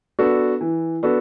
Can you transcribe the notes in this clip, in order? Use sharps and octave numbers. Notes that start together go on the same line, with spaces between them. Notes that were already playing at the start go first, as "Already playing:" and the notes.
B3 D4 F#4 A4
E3
B3 D4 F#4 A4